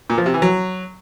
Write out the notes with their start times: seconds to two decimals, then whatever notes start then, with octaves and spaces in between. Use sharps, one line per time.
0.10 A#2
0.18 F3
0.26 C3
0.34 E3
0.42 F#3